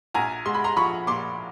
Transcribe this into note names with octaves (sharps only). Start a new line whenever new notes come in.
A#1 G#5 A#5
G#3 C6
B5
A#5 C6
F3 B5 C#6
A#2 C6 D6